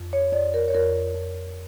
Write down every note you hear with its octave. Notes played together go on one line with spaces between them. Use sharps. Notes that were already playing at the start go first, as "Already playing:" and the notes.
Already playing: F2
C#5
F2 D5
A#4
C#5
F2 A#4
F2